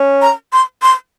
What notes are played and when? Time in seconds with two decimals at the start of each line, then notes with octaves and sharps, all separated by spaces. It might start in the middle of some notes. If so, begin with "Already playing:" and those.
Already playing: C#4
0.22 A#5
0.53 C6
0.82 C6